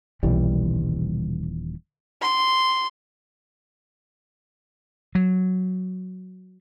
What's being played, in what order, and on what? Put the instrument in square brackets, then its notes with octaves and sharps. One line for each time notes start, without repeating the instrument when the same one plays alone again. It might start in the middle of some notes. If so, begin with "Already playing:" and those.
[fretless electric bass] D#1 E3 G3 [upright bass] B1 D3
[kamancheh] C6
[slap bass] F#3